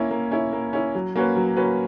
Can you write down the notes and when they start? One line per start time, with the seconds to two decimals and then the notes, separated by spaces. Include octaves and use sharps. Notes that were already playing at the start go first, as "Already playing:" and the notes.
Already playing: A#3 C#4 E4
0.11 A#3
0.31 C#4 E4
0.53 A#3
0.73 C#4 E4
0.95 F#3
1.16 A#3 C#4 F#4 B4
1.36 F#3
1.57 A#3 C#4 F#4 B4